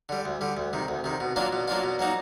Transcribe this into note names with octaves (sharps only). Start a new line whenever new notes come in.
D3 G3
D2
D3 G3
D2
C3 D#3
D2
C3 D#3
B2
F#3 A#3 D4 F4
B2
F#3 A#3 D4 F4
B2
F#3 A#3 D#4 F#4